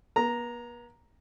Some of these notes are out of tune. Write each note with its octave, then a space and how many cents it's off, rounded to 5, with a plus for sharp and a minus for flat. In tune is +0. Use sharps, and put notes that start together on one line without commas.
B3 -45 A#5 +0